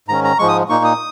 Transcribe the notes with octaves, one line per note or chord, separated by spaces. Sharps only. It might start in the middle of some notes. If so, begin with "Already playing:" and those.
G#2 D#3 C#4 A#5
A#5
G#2 F3 G#3 C#6
D#6
A#2 A#3 D#4 C#6
D#6